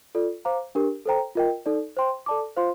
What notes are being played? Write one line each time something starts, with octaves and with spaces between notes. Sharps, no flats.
F4 A4 D5
C5 F5 A#5 D6
D4 G4 A#4
A4 C5 G5 A#5
F4 A#4 D#5 G5
D#4 A4 D5
C5 G5 C6
A4 D5 A5 D6
F4 C5 F5 C6